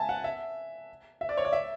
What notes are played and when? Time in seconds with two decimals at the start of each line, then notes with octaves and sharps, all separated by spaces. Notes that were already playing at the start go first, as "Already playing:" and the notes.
Already playing: E5 G#5 A5
0.09 F#5
0.24 E5
1.21 E5
1.29 D5
1.37 C#5
1.45 D5
1.53 E5